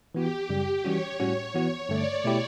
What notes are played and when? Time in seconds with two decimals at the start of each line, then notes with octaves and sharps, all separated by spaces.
0.15 E3 B3 F#4 G4
0.49 F#2 C#3 G3 G4
0.84 E3 G3 C#4 F#4 C#5
1.20 A2 G3 C#4 F#4
1.55 E3 B3 F#4 C#5
1.89 G2 D3 A3 D5
2.24 B2 A3 E4 G4